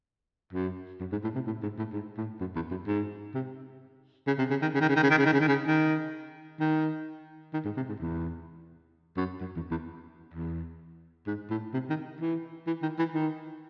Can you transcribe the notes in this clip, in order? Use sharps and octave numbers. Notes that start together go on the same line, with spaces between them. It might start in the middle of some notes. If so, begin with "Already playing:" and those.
F#2
F#2
G#2
A2
C3
A2
G#2
A2
G#2
A2
F#2
E2
F#2
G#2
C3
C#3
C3
C#3
D#3
C#3
D#3
C#3
D#3
C#3
D#3
C#3
D#3
C#3
D#3
C#3
D#3
D#3
D#3
G#2
C3
G#2
E2
F#2
F#2
E2
E2
E2
G#2
A2
C3
D#3
E3
E3
D#3
E3
D#3